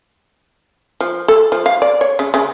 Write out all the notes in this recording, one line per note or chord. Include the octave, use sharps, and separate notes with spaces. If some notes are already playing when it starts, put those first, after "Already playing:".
F3
A4
F3
F5
D5
C#5
C#3
C#3